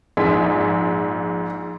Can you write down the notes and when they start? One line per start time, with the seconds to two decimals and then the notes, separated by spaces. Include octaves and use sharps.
0.17 A#1 G#2 B6